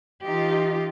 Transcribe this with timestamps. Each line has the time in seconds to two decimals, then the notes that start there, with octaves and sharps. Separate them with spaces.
0.24 E3 D#4 F4 G4